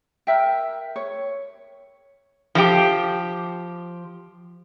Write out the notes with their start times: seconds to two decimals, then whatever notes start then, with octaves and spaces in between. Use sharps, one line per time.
0.27 A#4 E5 G5
0.96 C#5
2.55 F3 G4